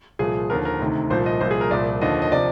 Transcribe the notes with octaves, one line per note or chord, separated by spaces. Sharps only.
C2 A#2 F3 G#4
D#2 D3 F3 A#4
A#4
D2 C3 D#3
C2 A#2 F3 C5
D#5
C2 A#2 F3 C5
G#4
A#4
C2 A#2 F3 D5
D#2 D3 F3 D#5
D#5
C3 F3 D5